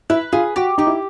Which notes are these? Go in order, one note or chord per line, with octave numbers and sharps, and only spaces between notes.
E4 B4
F4 G#4
F#4 G4
D#4 G4
E4